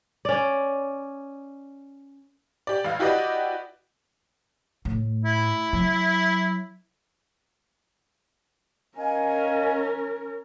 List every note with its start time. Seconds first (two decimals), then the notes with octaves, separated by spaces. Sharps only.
0.25 C#4 D5
2.67 G4 D5
2.84 A1 F5
2.99 E4 F#4 G4 B4 D5 D#5
4.85 A2
5.24 E4
5.73 F#3
8.98 C#4 A#4 D#5 F5 G#5